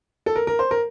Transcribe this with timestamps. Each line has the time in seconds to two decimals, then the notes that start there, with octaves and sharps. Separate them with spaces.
0.26 A4
0.36 A#4
0.47 A#4
0.59 C5
0.71 A#4